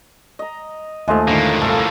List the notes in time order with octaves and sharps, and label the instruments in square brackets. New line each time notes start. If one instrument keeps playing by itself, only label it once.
[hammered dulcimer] D#5 A#5
[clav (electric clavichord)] D#2 A3 [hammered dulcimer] F3 G#3 [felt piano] D#5 C6 D6
[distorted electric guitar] A2 A#3 [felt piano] D3 D#3
[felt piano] C2 [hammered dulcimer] A4 F5